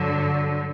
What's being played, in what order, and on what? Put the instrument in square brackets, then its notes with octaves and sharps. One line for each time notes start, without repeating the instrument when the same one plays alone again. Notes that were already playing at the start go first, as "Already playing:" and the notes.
Already playing: [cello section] G2 D3 F#3